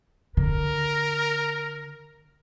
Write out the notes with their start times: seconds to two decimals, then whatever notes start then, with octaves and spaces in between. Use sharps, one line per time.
0.37 D3 A#4